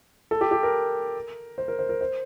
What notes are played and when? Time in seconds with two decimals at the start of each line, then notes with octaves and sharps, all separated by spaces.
0.31 A4
0.41 G4
0.51 G4
0.63 A#4
1.58 C5
1.68 A#4
1.79 C5
1.89 A#4
2.01 C5